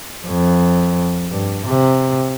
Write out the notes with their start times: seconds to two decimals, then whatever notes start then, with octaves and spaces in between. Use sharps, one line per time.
0.26 F2
1.30 G2
1.66 C3